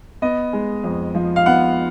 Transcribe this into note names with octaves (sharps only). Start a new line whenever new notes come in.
B3 D#5
G#3
F2
F3
F5
B3 F#5